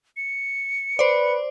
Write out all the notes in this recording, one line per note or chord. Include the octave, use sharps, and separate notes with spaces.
C#7
B4 C5 D5